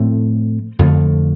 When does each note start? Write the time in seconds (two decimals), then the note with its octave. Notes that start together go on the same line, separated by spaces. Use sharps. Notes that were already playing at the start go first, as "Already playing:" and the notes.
Already playing: A2 F3 A3 C4
0.79 F2 D3 F3 A3